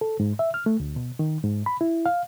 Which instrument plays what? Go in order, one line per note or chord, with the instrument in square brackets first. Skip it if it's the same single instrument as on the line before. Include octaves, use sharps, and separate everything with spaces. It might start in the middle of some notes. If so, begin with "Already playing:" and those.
[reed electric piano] A4
G#2
E5
F6
A3
D2
B2
D#3
G#2
B5
E4
F5